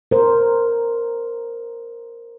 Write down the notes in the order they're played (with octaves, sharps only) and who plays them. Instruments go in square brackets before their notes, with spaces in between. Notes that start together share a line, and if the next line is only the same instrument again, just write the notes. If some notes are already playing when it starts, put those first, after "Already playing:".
[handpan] A#4 C5